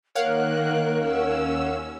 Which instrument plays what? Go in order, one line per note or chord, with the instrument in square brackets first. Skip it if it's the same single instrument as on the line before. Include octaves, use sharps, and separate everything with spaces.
[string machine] D#3 A#3 F#6 [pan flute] A#4 [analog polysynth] C#5 F5 F#5
[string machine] D#2 C#4 E6